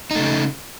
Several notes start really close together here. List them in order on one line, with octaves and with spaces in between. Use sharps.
D#4 A3 C#3